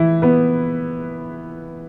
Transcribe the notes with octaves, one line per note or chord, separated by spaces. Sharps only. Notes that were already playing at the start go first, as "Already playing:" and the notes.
Already playing: E3 E4
B3 B4